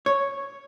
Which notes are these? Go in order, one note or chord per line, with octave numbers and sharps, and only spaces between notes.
C#5